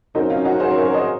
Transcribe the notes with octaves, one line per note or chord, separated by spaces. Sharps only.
F#2 C4 D#4
C#4 F4
D#4 F#4
G#4 C5
A#4 C#5
A#4 C#5
C5 D#5